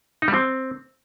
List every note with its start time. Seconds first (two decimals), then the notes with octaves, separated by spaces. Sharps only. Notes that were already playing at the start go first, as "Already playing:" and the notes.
0.22 D#4
0.28 G3
0.34 C4